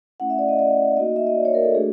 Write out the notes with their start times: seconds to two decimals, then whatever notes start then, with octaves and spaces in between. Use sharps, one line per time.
0.20 A3 C#4 E4 F#5
0.30 E5
0.39 D5
0.49 D#5
0.59 D5
0.97 A#3 D#4 F#4 D#5
1.16 E5
1.27 D#5
1.36 D5
1.45 C#5
1.54 A#4
1.64 A4
1.74 A3 D4 F#4 G#4